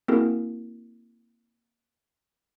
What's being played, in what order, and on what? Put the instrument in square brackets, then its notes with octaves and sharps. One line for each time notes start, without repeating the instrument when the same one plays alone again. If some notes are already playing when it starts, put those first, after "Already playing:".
[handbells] A#3 C4 E4 F#4 G#4 A#4